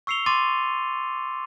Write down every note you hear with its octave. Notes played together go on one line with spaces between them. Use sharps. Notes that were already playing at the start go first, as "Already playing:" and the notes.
C#6 E6 C7 C#7 F7 G7
C6 D6 A6 D#7